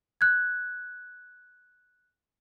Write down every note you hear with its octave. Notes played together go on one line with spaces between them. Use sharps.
F#6 G#6